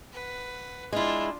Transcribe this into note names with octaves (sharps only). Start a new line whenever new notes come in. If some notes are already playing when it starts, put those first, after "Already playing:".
B4 F#5
G#3 D4 E4 F4